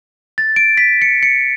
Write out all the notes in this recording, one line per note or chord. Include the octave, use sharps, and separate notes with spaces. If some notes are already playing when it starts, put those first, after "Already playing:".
A6
D7
B6
C#7
C#7